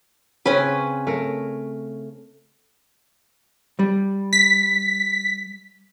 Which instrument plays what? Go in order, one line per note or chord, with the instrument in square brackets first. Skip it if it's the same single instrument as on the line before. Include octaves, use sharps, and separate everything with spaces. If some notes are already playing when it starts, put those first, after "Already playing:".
[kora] C#3 C4 [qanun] C#4 B4
[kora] A3 A#4
[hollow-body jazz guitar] G3
[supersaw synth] B6